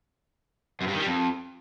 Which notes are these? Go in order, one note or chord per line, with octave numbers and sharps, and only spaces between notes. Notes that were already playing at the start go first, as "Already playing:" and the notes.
F#2
G2
D#3
G3
F2